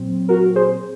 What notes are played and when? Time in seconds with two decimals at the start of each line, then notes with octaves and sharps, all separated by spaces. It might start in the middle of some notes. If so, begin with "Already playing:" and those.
Already playing: A#2 F#3 C4
0.29 F#4 A#4
0.56 G#4 C5